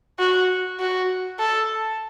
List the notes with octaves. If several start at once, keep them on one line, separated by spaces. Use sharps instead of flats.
F#4
F#4
A4